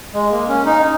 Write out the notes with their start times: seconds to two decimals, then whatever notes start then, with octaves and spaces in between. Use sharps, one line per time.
0.13 G#3
0.31 A#3
0.48 C#4
0.66 D#4